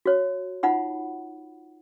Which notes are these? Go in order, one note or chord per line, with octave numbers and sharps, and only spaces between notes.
F#4 C#5
D#4 F4 F#5 B5